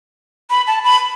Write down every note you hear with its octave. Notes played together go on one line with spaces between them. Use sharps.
B5
A5
B5